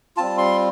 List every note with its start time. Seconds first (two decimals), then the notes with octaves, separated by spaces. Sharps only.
0.17 G3 C4 F4 A5
0.38 C6